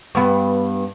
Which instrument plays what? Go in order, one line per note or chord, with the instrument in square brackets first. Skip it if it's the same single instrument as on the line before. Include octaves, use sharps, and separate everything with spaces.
[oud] G2 B3